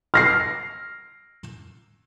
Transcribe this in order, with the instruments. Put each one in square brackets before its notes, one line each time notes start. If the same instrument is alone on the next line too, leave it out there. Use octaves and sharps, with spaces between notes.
[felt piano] F6 A#6 C7